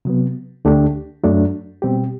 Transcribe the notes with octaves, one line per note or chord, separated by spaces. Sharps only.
C3 F#3 B3
D2 D3 A3 D4 G4
F#2 F#3 A3 D4
B2 G3 C4 G4